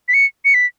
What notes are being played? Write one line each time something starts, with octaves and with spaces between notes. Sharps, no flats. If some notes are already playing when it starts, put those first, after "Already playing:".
B6
C#7
C#7
B6